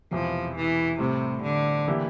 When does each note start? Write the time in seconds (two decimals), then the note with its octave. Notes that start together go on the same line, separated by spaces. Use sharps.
0.11 E1 E2 C3 E3 F3
0.56 E3
1.00 A2 C3 G3 C4
1.43 D3
1.88 E3 A#3 E4 G4